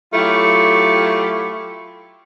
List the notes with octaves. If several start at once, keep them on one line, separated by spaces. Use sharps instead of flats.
F#3 A3 E4 F4 G4